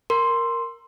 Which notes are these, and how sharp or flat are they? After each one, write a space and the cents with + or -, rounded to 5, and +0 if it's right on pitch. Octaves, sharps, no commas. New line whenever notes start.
A#4 +0 C6 +0